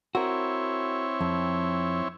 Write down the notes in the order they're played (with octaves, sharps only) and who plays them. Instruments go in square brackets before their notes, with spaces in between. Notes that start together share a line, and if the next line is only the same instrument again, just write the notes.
[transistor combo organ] C4 E4 C#5 [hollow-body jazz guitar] F#4 A#4
[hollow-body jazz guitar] F2